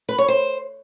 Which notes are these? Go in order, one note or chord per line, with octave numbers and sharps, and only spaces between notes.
B4
C#5
C5